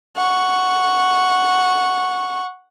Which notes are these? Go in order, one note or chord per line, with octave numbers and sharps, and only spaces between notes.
F#5 C#6